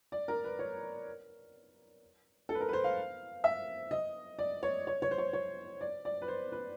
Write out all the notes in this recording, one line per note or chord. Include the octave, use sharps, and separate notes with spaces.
D5
A#4
B4
C#5
A4
B4
A#4
B4
C5
F5
E5
D#5
D5
C#5
C#5
C#5
C5
C#5
C#5
D5
D5
B4
C5
B4